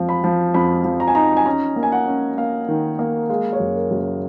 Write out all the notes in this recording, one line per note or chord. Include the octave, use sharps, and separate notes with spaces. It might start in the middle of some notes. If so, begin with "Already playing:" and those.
Already playing: F2 F3
B5
F3
F2 B5
F3
A#5
G#5
D#4 A#5
G#5
C#4 A#5
A#3
G#5
F#5
C#4
A#3 F5
D#3
A#3
G#3 F5
C#5
F#1
A#4
F#1
A#4